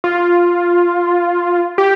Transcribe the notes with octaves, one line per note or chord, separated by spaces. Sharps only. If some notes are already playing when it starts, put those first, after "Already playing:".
F4
G4